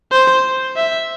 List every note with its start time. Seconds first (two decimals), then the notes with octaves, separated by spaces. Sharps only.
0.12 C5
0.76 E5